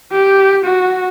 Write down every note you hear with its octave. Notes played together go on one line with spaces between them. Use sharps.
G4
F#4